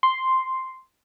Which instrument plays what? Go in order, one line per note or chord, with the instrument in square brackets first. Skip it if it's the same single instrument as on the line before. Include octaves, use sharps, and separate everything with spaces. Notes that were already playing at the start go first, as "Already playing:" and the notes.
[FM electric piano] C6